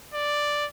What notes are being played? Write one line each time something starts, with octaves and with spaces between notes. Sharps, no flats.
D5